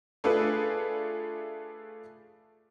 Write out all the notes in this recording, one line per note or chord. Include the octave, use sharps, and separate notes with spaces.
A3 D4 F4 G#4 A4 B4